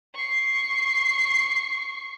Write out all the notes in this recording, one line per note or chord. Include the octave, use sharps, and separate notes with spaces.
C#6 C7